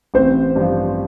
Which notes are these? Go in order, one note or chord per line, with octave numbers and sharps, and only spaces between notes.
A1 C4 C5
G2 F3